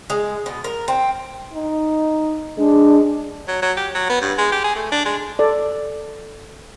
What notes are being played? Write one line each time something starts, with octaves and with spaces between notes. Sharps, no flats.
G#3
B2
A#4
C4
D#4
G#3 D4
F#3
F#3
G4
F#3
B3
G2
G#3
G4
G#4
A3
D4
G#3
A4 D5